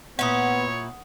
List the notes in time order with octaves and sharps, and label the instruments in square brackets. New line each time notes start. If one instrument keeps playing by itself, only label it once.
[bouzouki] A#2 E4 [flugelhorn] B3 [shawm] C#5 [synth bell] F#5 D#6